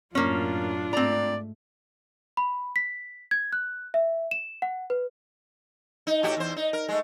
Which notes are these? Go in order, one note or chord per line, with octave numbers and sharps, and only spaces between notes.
F#2 A2 A#3 C#4 D4 F4
G#2 A3 C4 D5 A#5
B5
B6
G#6
F#6
E5
E7
F#5
B4
D#4
A2 F#4 G4
E2 C5
D#4
A#4
G#3 A3